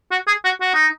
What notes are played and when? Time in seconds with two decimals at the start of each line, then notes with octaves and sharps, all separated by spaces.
0.11 F#4
0.27 G#4
0.45 F#4
0.61 F#4
0.74 D#4